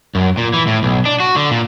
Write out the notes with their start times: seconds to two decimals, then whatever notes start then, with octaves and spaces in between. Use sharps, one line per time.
0.15 F#2
0.37 A#2
0.54 E3
0.67 A2
0.83 B1
1.05 D4
1.20 F#4
1.36 D3
1.51 A#2